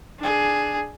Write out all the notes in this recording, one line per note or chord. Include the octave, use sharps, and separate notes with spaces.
D4 G#4